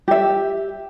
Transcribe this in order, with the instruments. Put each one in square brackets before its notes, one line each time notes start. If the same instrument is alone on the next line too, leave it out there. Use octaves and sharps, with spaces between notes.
[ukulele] G4 E5